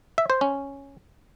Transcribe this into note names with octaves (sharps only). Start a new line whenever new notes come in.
E5
C5
C#4